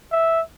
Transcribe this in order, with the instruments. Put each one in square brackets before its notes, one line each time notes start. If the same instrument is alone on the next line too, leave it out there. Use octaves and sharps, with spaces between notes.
[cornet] E5